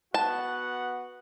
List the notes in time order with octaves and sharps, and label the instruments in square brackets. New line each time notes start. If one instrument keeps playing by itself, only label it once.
[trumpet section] B3 F#4 F#5 [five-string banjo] A5